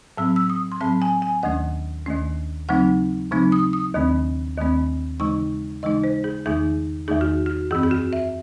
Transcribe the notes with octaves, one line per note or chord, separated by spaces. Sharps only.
A2 F#3 C4 E6
E6
D#6
C6
A2 F#3 C4 A5
G#5
G#5
D#2 D#3 A3 C#4 F#5
D#2 D#3 A3 C#4
C#3 F#3 A3 C4 D#4 F#5
C#3 F#3 A3 C4 D#4
D#6
D#6
D#2 D#3 A3 C4
D#2 D#3 A3 C4
C#3 E3 G#3 D#4 C#6
C#3 E3 G#3 D#4 D#5
C5
G#4
E2 D#3 A3 D#4 G#4
E2 D#3 A3 D#4 G#4
F#4
F#4
F#2 E3 C4 G#4
G#4
F#4
E5